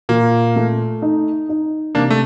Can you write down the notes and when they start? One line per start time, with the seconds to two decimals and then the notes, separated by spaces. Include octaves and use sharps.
0.09 A#2 A#3
0.56 A3
1.02 D#4
1.49 D#4
1.95 C3 A#3 D4
2.10 A3